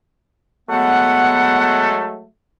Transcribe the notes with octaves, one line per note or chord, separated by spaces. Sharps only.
F#3 G#3 A3 B3 F#5